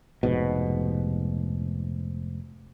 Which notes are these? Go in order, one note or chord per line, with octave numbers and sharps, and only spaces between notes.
F1 G#2 B2